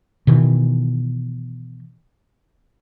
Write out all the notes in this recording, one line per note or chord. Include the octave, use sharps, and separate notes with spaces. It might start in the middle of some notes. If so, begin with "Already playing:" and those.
B2 D#3 E3